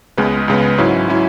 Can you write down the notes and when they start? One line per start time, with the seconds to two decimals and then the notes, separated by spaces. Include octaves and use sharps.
0.17 C#2 C#3 G#3 B3 B4
0.48 C#2 C#3 G#3 B3
0.78 G#2 F#3 C#4 E4
1.08 F#3 C#4 E4